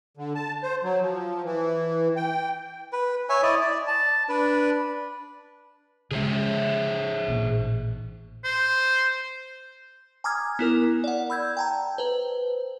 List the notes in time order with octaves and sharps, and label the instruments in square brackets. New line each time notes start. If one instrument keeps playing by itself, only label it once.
[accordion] D3
A5
C5
F#3
F3
E3
G5
[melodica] B4
C#5 E5 G#5
E4 D5 D#5
D5
A5
D4 B4
[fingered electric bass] C#3 G#3 [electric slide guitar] G#4 C5 E5
[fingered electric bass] A1 A#2
[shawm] C5
[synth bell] G#5 A#5 D6 D#6 F6 G#6
B3 E4 A#4
D5 F#5
B5 E6 G6 G#6
G5 A5 A#5
B4 C5